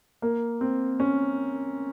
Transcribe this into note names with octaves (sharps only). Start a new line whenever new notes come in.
A#3
C4
C#4